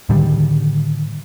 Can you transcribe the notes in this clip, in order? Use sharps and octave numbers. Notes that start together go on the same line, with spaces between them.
A2 D3 D#3 G3